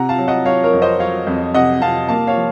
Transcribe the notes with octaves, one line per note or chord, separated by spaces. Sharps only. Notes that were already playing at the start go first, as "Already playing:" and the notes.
Already playing: C3 F#5 A#5
F5 A5
F#3
D#5 F#5
F#3 C#5 F5
A#4 C#5
F2
C5 D#5
F#3 C#5 F5
F2
C3 D#5 F#5
C3 F5 A5
A#3 F5 A5
C#5 F5
F3